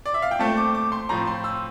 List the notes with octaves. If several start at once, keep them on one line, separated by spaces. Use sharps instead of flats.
D5
E5
F5
G5
A#2 A3 C4 A5
D6
D6
C6
A2 F3 C4 A#5
C6
E6